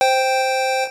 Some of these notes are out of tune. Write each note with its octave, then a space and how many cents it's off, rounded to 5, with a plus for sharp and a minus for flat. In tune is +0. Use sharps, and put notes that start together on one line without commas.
C5 +0 G5 +0